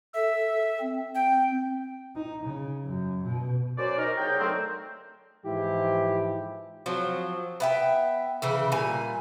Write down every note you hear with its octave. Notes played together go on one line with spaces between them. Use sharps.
A4 E5
C4
G5
D#4
C#3
F#2
B2
F#2 C#4 F#4 C5 D5
D#4 A#4
C2 F#3 D#4 G#4 G5
D3 D#3 F#3 A3 A#3 C4
G#2 E3 F3 E4 G4
F3 F#3 C4
B3 E5 G5
C#3 E3 E4
A#2 G3 G#5